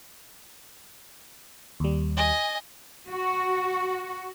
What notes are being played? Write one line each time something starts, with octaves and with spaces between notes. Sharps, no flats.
D#2 G3
D#5 G#5
F#4